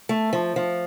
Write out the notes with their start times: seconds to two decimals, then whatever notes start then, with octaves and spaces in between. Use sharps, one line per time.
0.09 A3
0.33 F3
0.56 F3